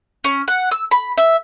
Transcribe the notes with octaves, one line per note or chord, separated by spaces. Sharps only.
C#4
F#5
E6
B5
E5